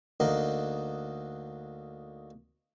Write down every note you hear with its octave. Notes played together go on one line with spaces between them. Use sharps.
D2 D3 A#3 D#4 A#4 D#5